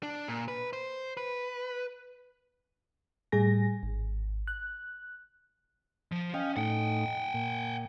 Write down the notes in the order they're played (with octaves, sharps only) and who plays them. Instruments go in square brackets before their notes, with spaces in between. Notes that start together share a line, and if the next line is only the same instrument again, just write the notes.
[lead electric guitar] D4
A#2
B4
C5
B4
[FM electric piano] A2 G3 G#4 G#5 A#6
G#1
F#6
[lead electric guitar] F3
[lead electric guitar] C#4 [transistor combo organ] D#5 F5 G5
[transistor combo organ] A2 D#4 [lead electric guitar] F#5 G5
[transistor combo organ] A#2